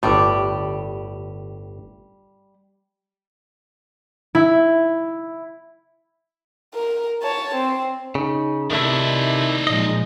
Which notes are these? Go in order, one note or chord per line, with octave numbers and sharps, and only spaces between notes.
G1 A2 G3 G4
E4
A#4
C#5 A5
C4
C#3 D#4
C3 D#3 A3 D#4 E4 D5
A#2 F3 G#3 D#5